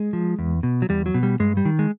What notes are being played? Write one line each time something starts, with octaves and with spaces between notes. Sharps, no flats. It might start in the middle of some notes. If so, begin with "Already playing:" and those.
Already playing: G#3
F3
E2
B2
F#3
E2 G3
F#3
B2
G3
G2 G#3
G3
D#3
G#3